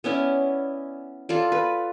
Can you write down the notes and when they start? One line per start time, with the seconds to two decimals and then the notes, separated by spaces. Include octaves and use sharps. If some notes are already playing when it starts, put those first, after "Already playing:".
0.04 B3 C#4 E4 D5
1.29 F4 A4 D5
1.52 B4